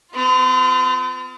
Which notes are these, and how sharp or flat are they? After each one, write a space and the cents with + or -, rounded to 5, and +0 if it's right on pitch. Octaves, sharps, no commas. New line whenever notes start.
C4 -45 F4 +0